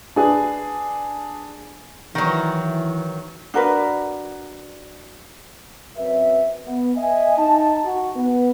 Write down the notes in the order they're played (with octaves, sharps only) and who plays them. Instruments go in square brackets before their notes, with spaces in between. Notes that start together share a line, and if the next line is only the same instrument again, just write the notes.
[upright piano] D4 G#4 B4
[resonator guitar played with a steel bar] D#3 F#3 [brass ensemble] E3
[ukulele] D4 F#4 A#4 B4
[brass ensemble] F#2 C4 B4 E5
B3
D#5 E5 G#5
D#4 A5
F#4
B3